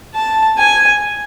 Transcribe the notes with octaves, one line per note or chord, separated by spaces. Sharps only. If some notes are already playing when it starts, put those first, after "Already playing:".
A5
G#5